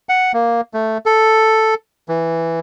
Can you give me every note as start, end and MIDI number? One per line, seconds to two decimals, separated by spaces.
0.09 0.32 78
0.34 0.61 58
0.74 0.98 57
1.06 1.74 69
2.09 2.60 52